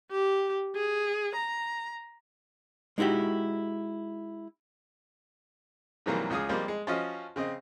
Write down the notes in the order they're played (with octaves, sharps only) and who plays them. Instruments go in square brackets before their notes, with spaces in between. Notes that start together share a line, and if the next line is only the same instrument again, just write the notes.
[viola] G4
G#4
A#5
[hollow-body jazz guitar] G#3 D#4 E4 F#4 G4
[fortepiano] G#2 C3 E3 F#3 G3 A#3
C#2 F4 G#4 D#6
F3 G3 G#3 A#3 C4
G#3
F3 C#4 F4 F#4 D#5
C#3 C4 D#5